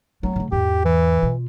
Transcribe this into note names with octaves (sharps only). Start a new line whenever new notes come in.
F#3 A3 C4
C#3 A3
E2 G#2 G4
E3
B2 F4